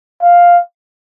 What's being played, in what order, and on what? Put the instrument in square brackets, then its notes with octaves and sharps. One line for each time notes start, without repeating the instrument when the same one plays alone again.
[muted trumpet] F5